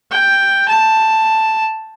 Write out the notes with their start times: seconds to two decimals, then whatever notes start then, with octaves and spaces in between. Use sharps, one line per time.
0.12 G5
0.68 A5